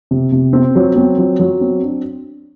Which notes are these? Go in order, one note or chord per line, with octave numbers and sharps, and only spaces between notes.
C3
C3
C4
F#3
C4
F#3
F#3
C4
D4